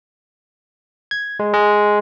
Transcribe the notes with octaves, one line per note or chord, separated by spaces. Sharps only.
G#6
G#3
G#3